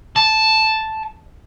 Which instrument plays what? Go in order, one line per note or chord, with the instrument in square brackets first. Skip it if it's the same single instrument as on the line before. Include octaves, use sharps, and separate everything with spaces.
[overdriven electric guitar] A5